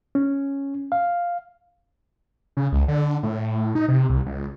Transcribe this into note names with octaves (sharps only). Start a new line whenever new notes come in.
C#4
F5
C#3
C#2
D3
A2
D#4
C3
C2
C#2